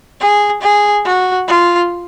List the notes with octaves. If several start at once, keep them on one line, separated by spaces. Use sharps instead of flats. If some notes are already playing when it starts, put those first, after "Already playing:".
G#4
G#4
F#4
F4